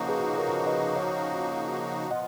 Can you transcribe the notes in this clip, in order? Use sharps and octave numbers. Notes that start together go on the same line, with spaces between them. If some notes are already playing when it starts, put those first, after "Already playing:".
Already playing: C#3 F3 A#3 D#4 F#4
G#4 B4
A#4 C#5
B4 D#5
C#5 F5
F3 B3 F4 D#5 F#5